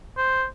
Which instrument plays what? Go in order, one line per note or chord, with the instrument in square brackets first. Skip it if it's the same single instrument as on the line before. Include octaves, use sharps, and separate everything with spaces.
[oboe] C5